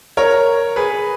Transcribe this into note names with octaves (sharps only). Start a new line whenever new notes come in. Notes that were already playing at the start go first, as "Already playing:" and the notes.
A#4 C#5
G#4 B4